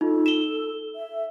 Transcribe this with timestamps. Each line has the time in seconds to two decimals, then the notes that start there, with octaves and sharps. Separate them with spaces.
0.01 D#4 F4 A4
0.26 E7 G7
0.96 E5